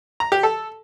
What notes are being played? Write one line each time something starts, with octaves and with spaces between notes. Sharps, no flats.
A#5
G4
A4